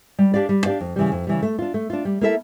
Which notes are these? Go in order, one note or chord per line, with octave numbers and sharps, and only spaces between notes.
G3
D4 G4 D5 F5
G3
D4 G4 D5 F5
F2
C#3 E3 G3
F2
C#3 E3 G3
A3
D4 F4
A3
D4 F4
G3
A#3 E4 A4 E5